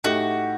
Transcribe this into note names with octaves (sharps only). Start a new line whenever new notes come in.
A2 A3 D#4 F#4 G4